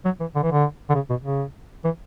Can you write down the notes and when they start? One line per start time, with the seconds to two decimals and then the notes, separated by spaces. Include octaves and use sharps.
0.05 F#3
0.20 E3
0.35 D3
0.43 E3
0.51 D3
0.90 D3
0.95 C#3
1.10 B2
1.25 C#3
1.85 E3